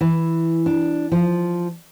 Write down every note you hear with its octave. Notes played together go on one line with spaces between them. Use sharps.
E3
D4
F3